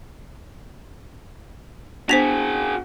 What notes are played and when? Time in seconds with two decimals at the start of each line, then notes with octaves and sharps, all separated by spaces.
2.09 B3 D4 F#4 G#4 C5 B6 F7